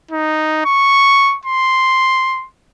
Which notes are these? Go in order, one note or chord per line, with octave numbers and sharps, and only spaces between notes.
D#4
C#6
C6